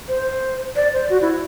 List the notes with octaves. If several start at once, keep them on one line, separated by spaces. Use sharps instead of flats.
C5
D5
C5
F#4
E4